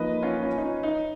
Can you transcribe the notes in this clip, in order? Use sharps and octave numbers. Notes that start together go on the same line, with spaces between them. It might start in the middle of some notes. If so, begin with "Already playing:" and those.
Already playing: F3 A#3 D#4 B4 D#5
C#4 F4
C#4 F4
D#4
C#4
D#4